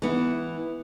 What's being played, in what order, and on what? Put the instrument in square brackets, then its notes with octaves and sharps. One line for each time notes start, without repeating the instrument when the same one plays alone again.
[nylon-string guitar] E3 B3 E4